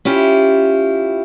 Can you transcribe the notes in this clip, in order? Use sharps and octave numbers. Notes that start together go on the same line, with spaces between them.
C#4 E4 F4 G4